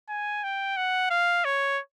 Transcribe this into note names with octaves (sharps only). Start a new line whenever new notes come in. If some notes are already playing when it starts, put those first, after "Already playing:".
G#5
G5
F#5
F5
C#5